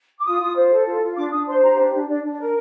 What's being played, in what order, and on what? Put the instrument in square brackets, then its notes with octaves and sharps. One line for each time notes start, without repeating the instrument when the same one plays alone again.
[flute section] D6
F4 D#6
F4
C5
A4
F4
F4
D4 D6
D4 D#6
C5 C6
G4 A#5
D4
D4
D4 D5
D4
D5
A#4